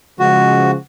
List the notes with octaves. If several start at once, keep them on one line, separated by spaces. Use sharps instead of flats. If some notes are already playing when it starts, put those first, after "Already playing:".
C#3 F3 G#3 F#4